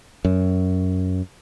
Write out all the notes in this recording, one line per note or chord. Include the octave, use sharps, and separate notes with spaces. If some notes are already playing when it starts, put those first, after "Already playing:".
F#2